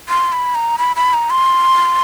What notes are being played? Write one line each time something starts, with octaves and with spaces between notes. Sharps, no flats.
C6
B5
A#5
B5
B5
A#5
C6